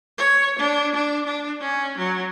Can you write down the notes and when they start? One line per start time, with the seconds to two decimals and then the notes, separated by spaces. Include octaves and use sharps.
0.17 C#5
0.59 D4
0.94 D4
1.25 D4
1.60 C#4
1.98 F#3